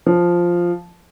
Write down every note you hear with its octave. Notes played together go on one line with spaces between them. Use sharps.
F3